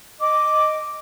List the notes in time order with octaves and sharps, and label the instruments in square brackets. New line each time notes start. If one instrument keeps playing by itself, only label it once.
[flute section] D#5 D6